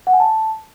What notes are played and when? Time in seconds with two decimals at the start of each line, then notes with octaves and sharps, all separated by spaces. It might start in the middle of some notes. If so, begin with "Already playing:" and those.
0.07 F#5
0.13 G#5
0.20 A5